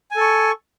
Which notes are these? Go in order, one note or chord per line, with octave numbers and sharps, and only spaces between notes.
A4 G#5 C#6